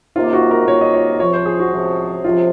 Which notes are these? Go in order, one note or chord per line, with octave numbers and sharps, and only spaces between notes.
C#2 C3 D#3 A#3 F4
F#4
A#4
C#2 C3 D#3 A#3 C#5
D#5
C#5
C#2 C3 F3 C#5
C5
G#4
F#4
C#2 C3 F3
C#2 C3 F3 F4